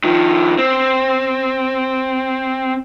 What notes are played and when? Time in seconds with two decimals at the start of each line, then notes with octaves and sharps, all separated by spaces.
0.04 D#3 F3
0.58 C4